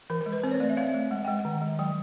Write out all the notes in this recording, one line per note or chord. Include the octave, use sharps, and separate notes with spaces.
E3 A#4
A#4
G#3
B4
C4 C5
C#5
A3 D5
E5
C4 F5
A3
G#3 F#5
G#3 G5
F#5
D#3
G#3
F#3 G5